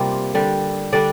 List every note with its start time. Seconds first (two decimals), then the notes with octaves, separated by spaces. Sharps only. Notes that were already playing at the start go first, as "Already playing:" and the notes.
Already playing: C3 G3 A#3 F4
0.34 D3 G3 D4
0.92 D3 G3 D4 D5